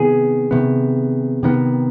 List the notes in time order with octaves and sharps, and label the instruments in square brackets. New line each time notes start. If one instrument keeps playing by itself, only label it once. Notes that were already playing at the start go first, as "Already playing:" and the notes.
Already playing: [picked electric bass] C3 D#3 B3 [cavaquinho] G#4
[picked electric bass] C3 D#3 B3
C3 D#3 B3